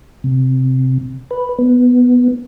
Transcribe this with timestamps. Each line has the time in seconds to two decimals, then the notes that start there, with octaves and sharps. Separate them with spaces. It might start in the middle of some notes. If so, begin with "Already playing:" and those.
0.24 C3
1.31 B4
1.59 B3